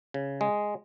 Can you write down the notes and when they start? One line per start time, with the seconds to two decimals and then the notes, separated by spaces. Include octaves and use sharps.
0.14 C#3
0.41 G#3